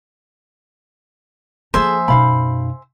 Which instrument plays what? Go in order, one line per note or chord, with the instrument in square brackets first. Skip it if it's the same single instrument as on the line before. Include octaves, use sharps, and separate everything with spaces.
[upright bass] F3 A#3 [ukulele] G#4 A4 [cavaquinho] C5 E5 G#5
[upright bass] F#2 B2 [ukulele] D#4 F5 B5